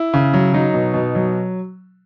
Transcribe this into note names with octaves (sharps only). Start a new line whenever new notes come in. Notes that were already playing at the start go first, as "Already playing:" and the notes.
Already playing: E4
C#3
F#3
F#3 D#4
B2
B2
F#3